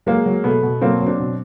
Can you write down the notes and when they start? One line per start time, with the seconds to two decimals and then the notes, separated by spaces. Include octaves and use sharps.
0.06 F#3 G#3 A#3
0.26 F#3
0.44 B2 A3 B3
0.63 B2
0.81 F#3 A#3 C4
1.00 F#3
1.06 C4 D4
1.19 B2